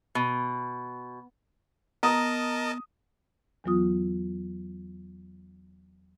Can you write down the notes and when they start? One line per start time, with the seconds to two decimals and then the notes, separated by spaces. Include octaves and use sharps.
0.15 B2
2.03 B3 A#4 D#5 A5 A#5 D#6
3.64 E2 E3 F#3 B3 F4 D#6